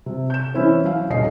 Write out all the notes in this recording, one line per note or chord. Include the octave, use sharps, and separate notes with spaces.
C3
G6 E7
E3 C#4 E4 C5
F#3 F5
D#1 D#5 F5 C7